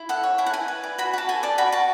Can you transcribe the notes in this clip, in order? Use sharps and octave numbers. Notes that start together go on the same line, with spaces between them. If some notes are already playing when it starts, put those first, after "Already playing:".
Already playing: E4
A4 F#5
C#5
E4 G#5
F#5
E4 G#5
B4
D5
F#4 B5
F#4 A5
A4 G#5
D5 A5
F#4 B5
F#4 A5